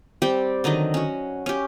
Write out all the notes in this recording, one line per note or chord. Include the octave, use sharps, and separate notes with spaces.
G3 C4 G4 G5
D3 D#3 F#3 D#5
C#4 F#4
C#4 G4